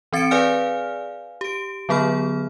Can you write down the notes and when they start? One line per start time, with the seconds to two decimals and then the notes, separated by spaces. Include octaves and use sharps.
0.13 E3 C4 A6 C#7 D7
0.31 G#4 B4 D5 F5 G#5 F6
1.41 G4 D7
1.89 D3 F#3 B3 G#4 B5 F6